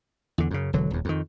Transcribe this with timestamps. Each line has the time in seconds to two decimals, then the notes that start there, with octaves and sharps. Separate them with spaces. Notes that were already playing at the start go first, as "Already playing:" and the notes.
0.38 E2 D3
0.51 F#2 C#3
0.73 E1 D3 F#3
0.90 D#1 E2
1.05 F2 D#3